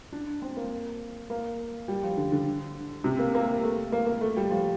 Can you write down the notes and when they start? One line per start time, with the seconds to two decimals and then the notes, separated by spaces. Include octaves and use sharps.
0.12 D4
0.42 C4
0.57 A#3
1.30 A#3
1.88 G3
2.03 F3
2.17 D3
2.32 D3
3.04 C3
3.19 A#3
3.35 A#3
3.63 A3
3.92 A#3
4.07 A#3
4.21 A3
4.37 G3
4.50 F3